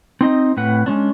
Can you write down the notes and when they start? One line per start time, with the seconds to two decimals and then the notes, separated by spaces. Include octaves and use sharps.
0.21 C4 D#4 D#5
0.57 A2 C4 B4 F#5
0.86 G#3 C#4 D4